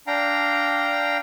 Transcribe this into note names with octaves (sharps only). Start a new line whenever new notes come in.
D4 F5 G5 A#5